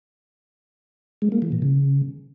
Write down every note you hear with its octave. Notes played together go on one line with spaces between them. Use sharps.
G#3
A#3
E3
A#2
C#3